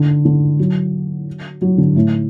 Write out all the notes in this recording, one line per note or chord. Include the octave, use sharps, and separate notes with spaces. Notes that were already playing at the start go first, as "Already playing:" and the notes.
Already playing: D3
D3
F#3
F#3
D3
A2